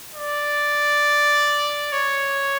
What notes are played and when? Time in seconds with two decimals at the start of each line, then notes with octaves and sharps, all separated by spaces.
0.15 D5
1.93 C#5